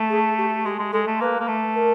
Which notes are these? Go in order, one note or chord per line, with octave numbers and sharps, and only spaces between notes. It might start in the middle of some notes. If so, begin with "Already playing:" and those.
Already playing: A3
G#4
G4
G#3 G4
G#3
G#3 A4
A3
A#3 B4
A#3
A3
A#4